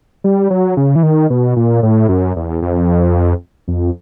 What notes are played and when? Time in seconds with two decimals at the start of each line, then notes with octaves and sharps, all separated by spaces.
0.24 G3
0.50 F#3
0.77 C#3
0.96 E3
1.03 D#3
1.30 B2
1.56 A#2
1.83 A2
2.09 F#2
2.36 E2
2.62 F2
3.68 F2